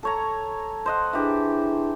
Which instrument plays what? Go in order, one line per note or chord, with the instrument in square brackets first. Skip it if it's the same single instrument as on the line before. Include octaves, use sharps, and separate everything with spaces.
[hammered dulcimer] A4 C#5 A#5
C5 D#5 F#5
[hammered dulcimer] E3 G4 [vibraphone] D4 E4 G#4